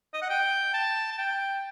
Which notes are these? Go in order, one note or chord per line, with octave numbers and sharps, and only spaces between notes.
D#5
F#5
G5
A5
A5
G5